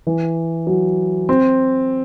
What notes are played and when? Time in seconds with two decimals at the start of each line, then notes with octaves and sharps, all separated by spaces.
0.07 E3
0.67 F#3
1.29 C4